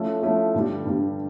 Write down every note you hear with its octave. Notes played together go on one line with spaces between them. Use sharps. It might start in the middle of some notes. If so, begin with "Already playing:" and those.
Already playing: F3 A3 C#4 E4 A4
F3 A3 C#4 E4 A4
G2 D3 G3
G2 D3 G3